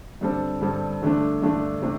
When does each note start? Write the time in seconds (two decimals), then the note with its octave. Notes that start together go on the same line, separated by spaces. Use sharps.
0.21 G2 D3 G3 C4 A4
0.61 G2 D3 G3 C4 A4
1.02 G2 D3 A3 D4
1.42 G2 D3 A3 D4
1.82 C3 A3 D4